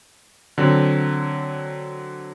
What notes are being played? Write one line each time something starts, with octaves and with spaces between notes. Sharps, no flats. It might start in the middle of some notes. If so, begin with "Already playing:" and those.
D3 F#3 C4